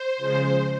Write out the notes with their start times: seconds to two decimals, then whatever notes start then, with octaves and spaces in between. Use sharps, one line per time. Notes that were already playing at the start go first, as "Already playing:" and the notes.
Already playing: C5
0.17 C#3 F3 G#3